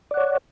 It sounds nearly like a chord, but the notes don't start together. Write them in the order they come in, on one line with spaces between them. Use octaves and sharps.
D5 F#5 C#5